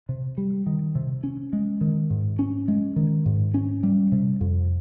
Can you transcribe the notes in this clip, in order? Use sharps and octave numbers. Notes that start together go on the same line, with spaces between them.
C3
G3
D#3
C3
C#4
G#3
D#3
G#2
C#4
G#3
D#3
G#2
C#4
G3
C3
F2